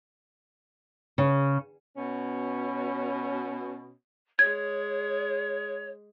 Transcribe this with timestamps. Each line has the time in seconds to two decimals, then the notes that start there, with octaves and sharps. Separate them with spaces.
1.18 C#3
1.97 B2 C#4
4.39 G#3 G#4 C#5 G#6